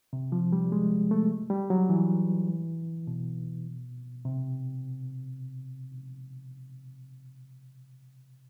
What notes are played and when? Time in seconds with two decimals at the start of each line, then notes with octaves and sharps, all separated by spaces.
0.13 C3
0.32 F3
0.52 G3
0.72 G#3
1.11 A3
1.50 G3
1.70 F#3
1.89 E3
3.07 B2
4.25 C3